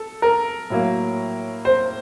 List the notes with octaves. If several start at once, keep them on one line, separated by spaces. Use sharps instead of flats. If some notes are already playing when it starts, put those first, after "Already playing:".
Already playing: A4
A#4
A2 F#3 A#3
C5